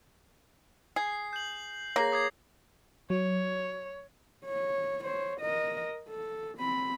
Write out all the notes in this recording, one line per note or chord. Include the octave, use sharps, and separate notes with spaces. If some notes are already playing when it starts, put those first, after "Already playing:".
G#4 C7
G6 F#7
A#3 G#4 C#5 A#6 C7
D6 D#6 G#6 C7
F#3 C#5
C#5
C5 C#5
A#4 D#5
A4
C4 B5